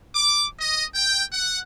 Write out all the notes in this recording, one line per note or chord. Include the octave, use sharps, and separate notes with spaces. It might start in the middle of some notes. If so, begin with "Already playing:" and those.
D6
D#5
G5
F#5